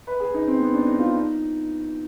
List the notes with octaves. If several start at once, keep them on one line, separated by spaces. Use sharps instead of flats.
B4
G#4
D#4
C4
B3
D4
D#4
F4
D#4